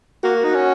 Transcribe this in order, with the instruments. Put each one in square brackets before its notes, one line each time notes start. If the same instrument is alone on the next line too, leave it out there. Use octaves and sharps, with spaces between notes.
[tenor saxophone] A#3 [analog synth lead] F#4
[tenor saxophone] D#4
C#4